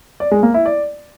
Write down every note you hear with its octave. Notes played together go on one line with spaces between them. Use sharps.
D5
G#3
A#3
E4
D5